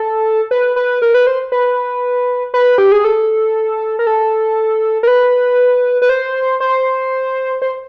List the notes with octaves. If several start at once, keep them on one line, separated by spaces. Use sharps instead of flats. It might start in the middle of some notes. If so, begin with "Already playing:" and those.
Already playing: A4
B4
B4
A#4
B4
C5
B4
B4
G4
G#4
A4
A#4
A4
A#4
B4
B4
C5
C5
C5